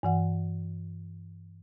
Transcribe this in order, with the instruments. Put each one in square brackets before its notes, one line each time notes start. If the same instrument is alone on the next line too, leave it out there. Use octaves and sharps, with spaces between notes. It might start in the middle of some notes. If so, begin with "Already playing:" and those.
[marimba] G2 E3 F#5